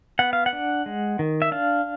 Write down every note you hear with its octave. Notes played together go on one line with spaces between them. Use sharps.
B3 F#5
F5
F#5
D4
G#3
D#3
E5
D4 F5